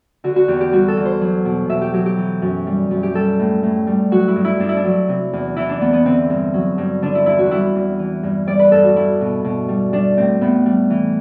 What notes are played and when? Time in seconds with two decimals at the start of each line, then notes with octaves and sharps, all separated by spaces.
0.24 D3 F#4
0.36 F#4
0.48 E2 G4
0.61 G4
0.72 G3 F#4
0.88 A4
0.97 E2
1.05 C5
1.21 F#3
1.45 B2
1.69 B2 E5
1.82 G4
1.94 F#3 G4
2.06 G4
2.17 E3
2.42 F#2
2.67 G3
2.91 F#2
3.03 G4
3.15 G3 A4
3.39 A2
3.63 A2
3.87 G3
4.11 F#3 F#4
4.28 E4
4.36 G2
4.45 E4
4.60 G2 D4
4.69 E4
4.77 D4
4.84 F#3
5.08 C3
5.33 E2
5.56 E3 E4
5.69 D4
5.81 E2 B3
5.93 B3
6.05 D3 C4
6.30 G2
6.54 F#3
6.78 G2
7.02 D3 D4
7.15 E4
7.26 E2 E4
7.38 F#4
7.51 G3 E4
7.75 E2
7.99 E3
8.23 G2
8.47 G3 D5
8.59 B4
8.72 G2 A4
8.84 F#4
8.96 G3 E4
9.21 B2
9.44 B2
9.69 G3
9.93 G3 D4
10.17 A2 C4
10.41 A2 B3
10.66 G3
10.90 E3